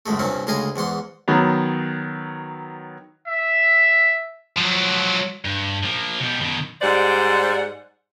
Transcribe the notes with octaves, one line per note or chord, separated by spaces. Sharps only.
C#2 F#2 G#3 A3
C2 G2 A#2 C4 C#4
D2 C#3 G#3 D#5 F5 G#5
E2 G#2 F#5 C6
D#3 F#3 B3
E5
F3 F#3
G2
F3 A#3
B2 G3
B2 D#3
G#2 G3 C5 D5 F#5